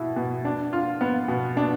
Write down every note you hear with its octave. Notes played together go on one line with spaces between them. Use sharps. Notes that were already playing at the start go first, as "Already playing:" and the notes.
Already playing: B2 E4
B2
D4
F4
B3
B2
D4